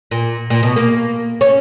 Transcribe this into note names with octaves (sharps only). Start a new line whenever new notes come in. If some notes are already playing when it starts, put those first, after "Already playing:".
A#2
A#2
B2
A#3
C#4